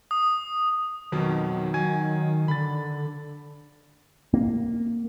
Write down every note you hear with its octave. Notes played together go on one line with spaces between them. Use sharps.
D#6
F2 B2 D#3 F#3
F#3 G#5 G#6
D3 B5 A6
A#3